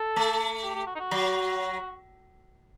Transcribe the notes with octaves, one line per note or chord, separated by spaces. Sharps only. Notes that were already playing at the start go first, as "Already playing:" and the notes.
Already playing: A4
A3
G4
G4
F#4
D#4
F#4
F#3